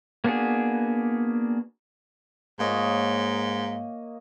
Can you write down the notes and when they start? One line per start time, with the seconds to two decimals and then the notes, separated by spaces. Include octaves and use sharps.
0.24 A#3 B3 D4 F#4 G#4
2.60 G#2 A#3 C#5 D#5